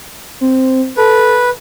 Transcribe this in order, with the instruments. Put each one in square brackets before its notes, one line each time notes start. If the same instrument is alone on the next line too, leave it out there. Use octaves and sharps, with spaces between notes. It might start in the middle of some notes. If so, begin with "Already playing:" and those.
[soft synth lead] C4
[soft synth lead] A4 [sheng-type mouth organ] B4